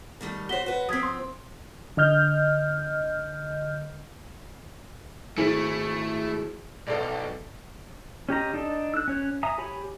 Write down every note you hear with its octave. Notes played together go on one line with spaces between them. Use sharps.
D#3 G3 A3
F#4 C5 C#5 B6 G7
F#4 B4
F3 C4 D#6 G#6 B6
C6
D3 D#5 F6 G6
G#1 A3 E4 G#4
B1 A4 D5
C#4 G4 D#5 A#5
D4 D#4 A4
E6 F#6
C#4 C#5 F#6
E5 G#5 A#5 D#6
G4 C#5 G#5 B5